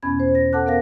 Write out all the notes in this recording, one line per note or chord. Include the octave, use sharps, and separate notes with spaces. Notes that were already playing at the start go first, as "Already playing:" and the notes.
E2 B2 B3 C#4 B5 G#6
C5
A#6
A4 F#5 A5 D6 F#6
B3 A#4 F5 A#6